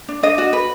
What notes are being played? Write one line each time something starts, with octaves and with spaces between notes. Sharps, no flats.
D4
D4 D#5
F#4
B4